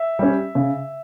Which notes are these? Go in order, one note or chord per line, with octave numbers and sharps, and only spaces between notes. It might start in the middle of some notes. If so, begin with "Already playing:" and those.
Already playing: E5
G3 C#4
C#3